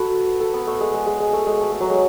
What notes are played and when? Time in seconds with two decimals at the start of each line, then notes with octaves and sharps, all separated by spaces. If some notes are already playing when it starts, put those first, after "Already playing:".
Already playing: F#4 A4 B4
0.40 A4
0.54 B3
0.67 A3
0.81 G#3
0.94 G#3
1.06 G#3
1.20 G#3
1.33 A3
1.47 G#3
1.60 A3
1.71 A3
1.81 F#3
1.90 G#3